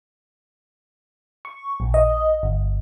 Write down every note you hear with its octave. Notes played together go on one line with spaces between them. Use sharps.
C#6
A#1
D#5
G1